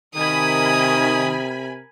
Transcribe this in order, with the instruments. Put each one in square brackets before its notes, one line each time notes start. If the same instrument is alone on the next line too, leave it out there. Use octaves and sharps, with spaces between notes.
[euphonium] C3 [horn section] D#3 [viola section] A#4 G#5 B5 [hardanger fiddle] D#6